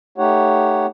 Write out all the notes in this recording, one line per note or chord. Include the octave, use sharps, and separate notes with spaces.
A3 D#4 G4 C#5 F#5